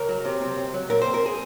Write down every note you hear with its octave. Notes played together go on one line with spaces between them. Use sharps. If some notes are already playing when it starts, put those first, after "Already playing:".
Already playing: C#2 A#4
F#3
C3
C4
C#2
F#3
A#2 A#4
C5
C4
A#4
G#4